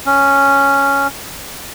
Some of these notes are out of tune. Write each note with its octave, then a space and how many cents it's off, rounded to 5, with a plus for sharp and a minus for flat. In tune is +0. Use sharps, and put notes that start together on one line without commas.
C#4 +0